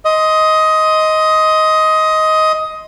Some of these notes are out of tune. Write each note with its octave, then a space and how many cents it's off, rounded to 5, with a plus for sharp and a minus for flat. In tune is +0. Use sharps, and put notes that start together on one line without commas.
D#5 +15 C6 +0